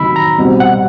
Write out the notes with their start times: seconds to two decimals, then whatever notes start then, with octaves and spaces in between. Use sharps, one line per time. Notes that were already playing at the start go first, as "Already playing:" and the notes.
Already playing: C3 D#3 F#3 B5 E6
0.16 A#5
0.38 C2 B2 G3 C4
0.60 F#5